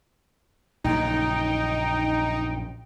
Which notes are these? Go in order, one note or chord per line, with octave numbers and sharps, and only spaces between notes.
A#1 F#2 C#3 D#4 G5